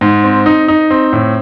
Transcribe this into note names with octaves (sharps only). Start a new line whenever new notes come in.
G#2
C4
D#4
D#4
C4
A2